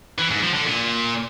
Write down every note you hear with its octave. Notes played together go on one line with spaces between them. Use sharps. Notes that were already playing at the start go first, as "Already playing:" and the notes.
E3
G#2
F3
D3
A#2